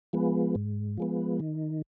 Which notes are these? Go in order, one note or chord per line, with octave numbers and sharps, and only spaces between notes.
F3 G#3 B3
G#2
F3 G#3 B3
D#3